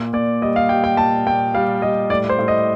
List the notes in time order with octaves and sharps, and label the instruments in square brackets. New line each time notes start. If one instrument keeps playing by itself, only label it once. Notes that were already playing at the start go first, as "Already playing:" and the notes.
Already playing: [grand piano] A#2
A#2 D5
G3 D#5
F5
G3 G5
G5
A#2 A5
A#2 G5
G3 F5
G3 D#5
A2 D5
C5
A2
D#5